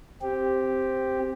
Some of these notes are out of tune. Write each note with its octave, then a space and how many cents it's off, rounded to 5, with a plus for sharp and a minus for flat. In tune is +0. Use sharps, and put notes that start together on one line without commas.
C4 +0 G4 +0